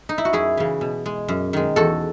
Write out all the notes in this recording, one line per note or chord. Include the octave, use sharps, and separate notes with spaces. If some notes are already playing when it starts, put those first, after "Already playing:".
D#4
E4
F#4
F#2 E4 G#4
C#3 E3
B2
G#3
F#2
D#3 G#3
E2 F#4 A4